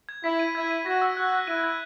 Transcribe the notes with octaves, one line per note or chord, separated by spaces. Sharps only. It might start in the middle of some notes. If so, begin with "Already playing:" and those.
G#6
E4 B6
D#7
E4 G#6
D#7
F#4 A#6
E6
F#4 F#6
F#6
E4 D#7
G#6